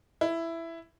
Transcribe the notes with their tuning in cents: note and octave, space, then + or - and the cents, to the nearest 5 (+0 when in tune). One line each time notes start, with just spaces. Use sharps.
E4 +10